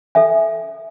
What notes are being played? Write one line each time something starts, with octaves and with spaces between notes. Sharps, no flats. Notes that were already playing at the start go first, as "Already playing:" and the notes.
A4 E5 G#5